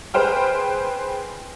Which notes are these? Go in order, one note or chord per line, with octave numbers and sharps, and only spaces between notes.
G#4 B4 C5 G5 F6